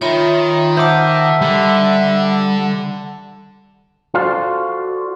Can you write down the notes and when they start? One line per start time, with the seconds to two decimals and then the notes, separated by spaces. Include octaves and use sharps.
0.01 D#3 F4 C#5 E5 B5
0.77 C5 E5 F#5 A5 D6
1.41 D3 G3
4.14 F4 F#4 A4 C5 D5 F5